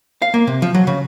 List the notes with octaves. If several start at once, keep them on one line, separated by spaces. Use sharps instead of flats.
F5
A#3
C3
F3
F#3
C#3